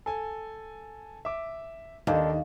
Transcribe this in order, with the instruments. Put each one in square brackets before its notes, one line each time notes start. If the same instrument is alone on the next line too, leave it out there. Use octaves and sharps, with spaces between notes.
[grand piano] A4 G#5
E5 D6
[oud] D#2 [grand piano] D#3 D4 A4